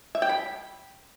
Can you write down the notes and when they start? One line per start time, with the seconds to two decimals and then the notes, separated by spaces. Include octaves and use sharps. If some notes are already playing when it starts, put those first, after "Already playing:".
0.15 E5
0.22 G5
0.29 B5